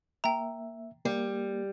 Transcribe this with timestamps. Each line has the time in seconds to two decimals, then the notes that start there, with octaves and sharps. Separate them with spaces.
0.24 A#3 E5 G5 A#5
1.05 G3 A#3